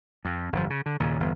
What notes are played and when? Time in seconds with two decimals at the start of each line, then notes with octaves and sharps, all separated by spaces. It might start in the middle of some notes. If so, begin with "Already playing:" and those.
0.25 F2
0.53 G1 F2 B2 F3
0.70 C#3
0.86 D3
1.00 D#2 A#2 C#3
1.20 G1 E2